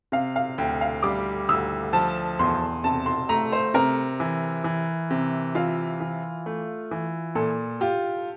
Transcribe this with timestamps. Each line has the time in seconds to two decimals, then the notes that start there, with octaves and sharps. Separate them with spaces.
0.12 C3 F5
0.36 F5
0.58 D2 G5
0.81 F5
1.02 G3 D6
1.49 D2 E6
1.93 F3 A5
2.39 E2 C6
2.84 C3 A5
3.06 C6
3.29 A3 A#5
3.52 C5
3.74 C3 A#4
4.20 E3
4.64 E3
5.11 C3
5.55 E3 F4
6.00 E3
6.46 A3
6.91 E3
7.35 A#2 A4
7.81 F4 G4